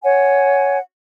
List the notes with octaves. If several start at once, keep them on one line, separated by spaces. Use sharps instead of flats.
C#5 F#5 G#5